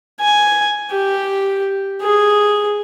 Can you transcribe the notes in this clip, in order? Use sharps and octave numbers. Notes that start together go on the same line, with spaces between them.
G#5
G4
G#4